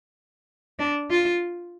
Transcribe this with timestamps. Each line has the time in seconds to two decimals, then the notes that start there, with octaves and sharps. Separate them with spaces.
0.79 D4
1.10 F4